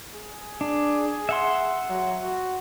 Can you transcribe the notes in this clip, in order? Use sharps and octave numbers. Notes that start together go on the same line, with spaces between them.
G#4
D4
E5 F#5 C6
F#3
F#4